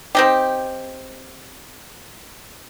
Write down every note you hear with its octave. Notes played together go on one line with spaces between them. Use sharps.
C4 D#4 G4